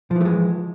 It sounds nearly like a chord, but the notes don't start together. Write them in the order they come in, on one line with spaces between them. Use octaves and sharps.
F3 E3 A3 G#3